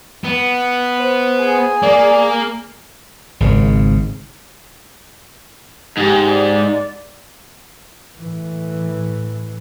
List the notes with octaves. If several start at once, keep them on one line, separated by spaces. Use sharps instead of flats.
B3
C5
G#4
A#3 D5
G#1 C#3
G#2 G4 G#4
D5
A2 E3